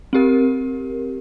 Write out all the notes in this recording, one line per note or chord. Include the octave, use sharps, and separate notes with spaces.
C4 G4 A#4